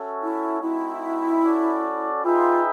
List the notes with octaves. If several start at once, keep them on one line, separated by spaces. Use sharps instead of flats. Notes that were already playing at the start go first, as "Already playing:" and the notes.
Already playing: C#4 F#4 A4 C#5 E5
E4
A3 C4 D#4 E4 F#4
C#4 F#4 A4 D5
D#4 F4 G#4 B4 E5 G5